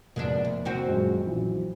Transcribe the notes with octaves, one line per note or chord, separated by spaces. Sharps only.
F1 G#2 B2 A#3 D4
D2
D#2 C4 F#4
D#1 F#2 G#3
A#1 E3 F#3